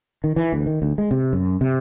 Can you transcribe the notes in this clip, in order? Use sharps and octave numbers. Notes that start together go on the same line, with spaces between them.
D#3
E3
D2
D#3
D2
G#3
C3
F#2
C3